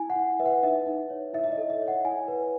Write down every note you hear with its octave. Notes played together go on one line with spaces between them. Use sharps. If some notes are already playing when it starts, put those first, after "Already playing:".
Already playing: E4 G#5
F#5
E4
B4 E5
F#5
D#4 E5
D#4
C#5
E4 E5
E5
D#5
A4
E5
C#5
F#5
E4 G#5
B4